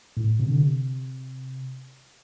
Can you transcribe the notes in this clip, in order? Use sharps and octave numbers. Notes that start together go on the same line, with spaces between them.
A2
C3
D3
C3